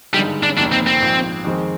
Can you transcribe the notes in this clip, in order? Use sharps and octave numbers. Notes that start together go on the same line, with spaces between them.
G#1 G2 D3 G3 G#3 D#4
D4
F1 D#2 D#3 A#3 D4
C4
C4
A#1 G#2 F3
F2 D#3 G#3 C4